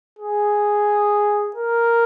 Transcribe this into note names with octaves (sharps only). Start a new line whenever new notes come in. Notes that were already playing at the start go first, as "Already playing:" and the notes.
G#4
A#4